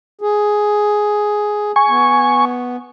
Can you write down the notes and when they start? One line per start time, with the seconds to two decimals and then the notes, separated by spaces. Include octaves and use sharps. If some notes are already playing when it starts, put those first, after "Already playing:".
0.21 G#4
1.76 G#5 C#6
1.89 B3